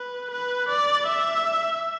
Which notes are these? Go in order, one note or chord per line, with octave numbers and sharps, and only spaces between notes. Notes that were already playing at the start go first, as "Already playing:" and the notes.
Already playing: B4
B4
D5
E5